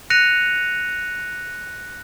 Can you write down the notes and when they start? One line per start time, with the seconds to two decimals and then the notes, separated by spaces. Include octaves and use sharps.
0.10 F#6 A#6 C#7 D#7 F7